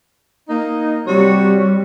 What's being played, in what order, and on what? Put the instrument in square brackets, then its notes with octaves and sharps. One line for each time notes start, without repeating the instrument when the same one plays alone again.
[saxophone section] A#3 D#4
[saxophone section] C3 F#4 C#5 [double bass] G3